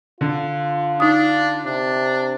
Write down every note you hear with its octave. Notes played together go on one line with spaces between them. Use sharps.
D3 F4
D4 D#4 D#6
C3 D4